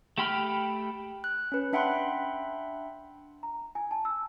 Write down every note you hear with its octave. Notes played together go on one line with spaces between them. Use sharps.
A3 G4 G5 B5 F6
F#6
C#4 B4
D4 E5 F#5 G5 B5 C6
A#5
G#5
A5
E6